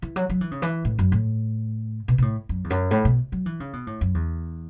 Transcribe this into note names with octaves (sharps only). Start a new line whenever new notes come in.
E3
F#3
F#3
E3
C#3
E3
A2
F#2
A2
B2
B2
A2
F#2
E2
F#2
A2
B2
F#3
E3
C#3
B2
A2
F#2
E2